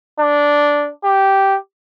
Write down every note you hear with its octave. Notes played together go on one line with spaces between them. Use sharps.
D4
G4